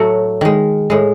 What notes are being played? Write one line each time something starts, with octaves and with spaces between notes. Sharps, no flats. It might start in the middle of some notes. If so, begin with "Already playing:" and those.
Already playing: A2 F#3 A3 F#4
D#3 G#3
A2 G#3